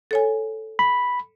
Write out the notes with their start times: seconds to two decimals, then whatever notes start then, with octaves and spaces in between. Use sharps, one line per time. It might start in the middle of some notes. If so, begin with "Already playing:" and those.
0.11 A4 C#5 G#5
0.79 B5